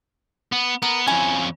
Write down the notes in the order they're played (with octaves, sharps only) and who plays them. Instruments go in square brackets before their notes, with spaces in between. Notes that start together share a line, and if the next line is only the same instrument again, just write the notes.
[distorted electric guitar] B3
[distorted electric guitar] B3 [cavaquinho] A#4
[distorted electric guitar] F2 C#4 [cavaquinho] E4 G#5